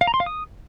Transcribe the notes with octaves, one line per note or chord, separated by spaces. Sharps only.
F5
A#5
C6
F5
D#6